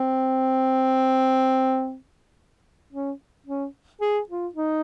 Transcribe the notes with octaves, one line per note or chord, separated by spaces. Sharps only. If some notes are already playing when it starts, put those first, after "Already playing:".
Already playing: C4
C#4
C#4
G#4
F4
D#4